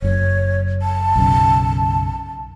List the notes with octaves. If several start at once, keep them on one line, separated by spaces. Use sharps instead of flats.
F#1 F#2 C#5
A5
B1 F#2 C#3